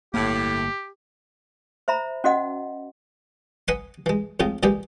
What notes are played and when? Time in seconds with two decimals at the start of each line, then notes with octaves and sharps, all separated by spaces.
0.14 G1 A2 A#3 G4
1.88 C5 E5 A#5 B5
2.24 C#4 F#4 D#5 F#5
3.68 B4 D#5 F#5 G#5 B5 C6
4.06 E3 G#3
4.40 F2 A2 G#3 F4 D#5
4.63 A#2 E3 G3 G#3 G4 G#4